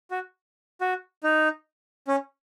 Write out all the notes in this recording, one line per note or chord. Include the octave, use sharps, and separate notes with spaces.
F#4
F#4
D#4
C#4